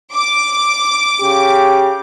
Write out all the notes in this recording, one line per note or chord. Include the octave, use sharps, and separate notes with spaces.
D6
C#3 G4